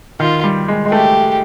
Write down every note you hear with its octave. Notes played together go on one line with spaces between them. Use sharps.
D#3 F4
G3
G#3
G#3
A3 G4